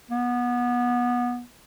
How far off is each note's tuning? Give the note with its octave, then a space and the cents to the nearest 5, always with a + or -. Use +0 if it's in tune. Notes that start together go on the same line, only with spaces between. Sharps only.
B3 -20